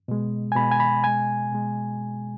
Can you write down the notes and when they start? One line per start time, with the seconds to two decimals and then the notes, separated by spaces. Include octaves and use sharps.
0.08 B2 G#3
0.52 G#5
0.56 B2 G#3 B5
0.71 G#5
0.80 B5
1.04 B2 G#3 G#5
1.52 B2 G#3